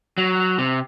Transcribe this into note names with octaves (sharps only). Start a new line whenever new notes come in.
F#3
C3